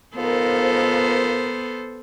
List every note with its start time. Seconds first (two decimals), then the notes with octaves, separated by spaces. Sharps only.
0.16 G#2 F3 B3 A4 A#4 C5